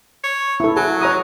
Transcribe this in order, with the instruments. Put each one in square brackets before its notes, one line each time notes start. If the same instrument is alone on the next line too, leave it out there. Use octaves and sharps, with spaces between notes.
[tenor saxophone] C#5
[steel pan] E4 A4
[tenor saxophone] F#3 [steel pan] G#4
[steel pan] C#5 A#5 D#6